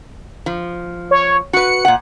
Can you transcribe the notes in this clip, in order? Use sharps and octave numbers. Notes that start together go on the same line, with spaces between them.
F3
C#5
F#4 B4 C#7
A#2 F#5